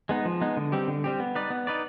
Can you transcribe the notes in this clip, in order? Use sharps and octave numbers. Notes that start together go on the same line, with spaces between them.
G#3 B3 D#4
F3
G#3 B3 D#4
D3
G3 C4 G4
D3
G3 C4 G4
B3
D#4 B4 D5
B3
D#4 B4 D5